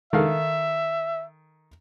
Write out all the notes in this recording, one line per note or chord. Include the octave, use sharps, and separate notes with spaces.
D#3 A4 E5 F5